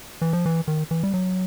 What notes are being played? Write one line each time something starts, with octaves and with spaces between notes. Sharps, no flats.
E3
F3
E3
D#3
E3
G3
F#3